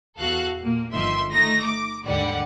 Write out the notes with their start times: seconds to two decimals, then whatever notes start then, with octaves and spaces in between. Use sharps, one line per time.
0.18 E2 F#4 A4 F5 F#6
0.59 A#2 A#3
0.94 G1 D#3 F3 E5 C6
1.32 A3 D#4 A#6
1.63 D6
2.04 D#2 G#2 D3 G3 D5 F#5